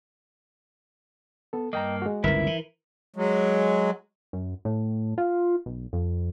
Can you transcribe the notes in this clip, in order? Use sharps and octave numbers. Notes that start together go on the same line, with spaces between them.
B3 A4
G2 A#3 D#5 G5 A#5
G#3 F#4
G1 C#2 E4 A#4 B4 E5
E3
F#3 G#3
F#2
A2
F4
B1
F2